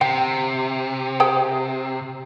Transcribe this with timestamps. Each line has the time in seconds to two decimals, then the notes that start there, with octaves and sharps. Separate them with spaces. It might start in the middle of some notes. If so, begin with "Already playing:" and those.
0.01 C3 G5
1.20 G#4 C5 G5